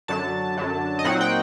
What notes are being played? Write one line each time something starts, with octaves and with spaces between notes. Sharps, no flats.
F#2 D3 F#3 A5
F#2 D3 F#3
D#5
A#2 F#3 C4 D#4 F#5
G5